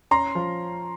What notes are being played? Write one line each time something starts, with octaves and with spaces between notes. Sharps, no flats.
C#4 A#5 C6
F3